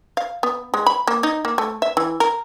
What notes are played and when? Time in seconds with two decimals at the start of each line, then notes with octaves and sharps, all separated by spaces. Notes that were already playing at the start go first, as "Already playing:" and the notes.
0.17 F5
0.43 B3
0.74 G#3
0.86 B5
1.07 A#3
1.23 D#4
1.45 A#3
1.58 A3
1.82 E5
1.97 E3
2.20 A#4